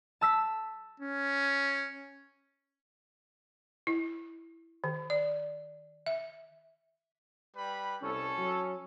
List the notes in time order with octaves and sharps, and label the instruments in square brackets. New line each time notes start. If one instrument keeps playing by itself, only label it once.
[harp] A5 E6 B6
[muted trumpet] C#4
[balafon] E4
D#3
D5
E5
[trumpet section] G3 B4 B5
[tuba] C2 [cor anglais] C#4 [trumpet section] A4
[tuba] F#3